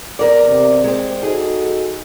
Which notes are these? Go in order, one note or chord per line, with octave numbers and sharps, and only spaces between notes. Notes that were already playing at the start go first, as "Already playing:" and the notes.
E2 A#4 D5
C3
G#3 C4
D#4 F#4 G#4 A4